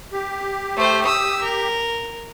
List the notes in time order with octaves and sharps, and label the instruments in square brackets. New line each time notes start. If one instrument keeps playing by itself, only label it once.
[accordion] G4
[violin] A3 C5
D#6 E6
A#4